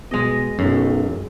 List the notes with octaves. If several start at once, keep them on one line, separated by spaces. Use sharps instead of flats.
B2 G#3 D#5
B1 F#2